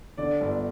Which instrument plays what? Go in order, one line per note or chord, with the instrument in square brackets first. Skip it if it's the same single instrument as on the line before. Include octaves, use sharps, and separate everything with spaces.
[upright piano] D3 D5
G1